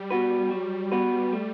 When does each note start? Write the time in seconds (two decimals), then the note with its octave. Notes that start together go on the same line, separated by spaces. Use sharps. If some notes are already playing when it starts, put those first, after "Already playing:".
Already playing: G3
0.11 B3 F#4 B4
0.51 F#3
0.92 B3 F#4 B4
1.33 A3